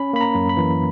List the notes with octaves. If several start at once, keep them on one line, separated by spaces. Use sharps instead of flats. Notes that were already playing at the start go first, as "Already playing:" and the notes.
Already playing: C#4 B5
A#3 B5
A#5
F#2
B5
E3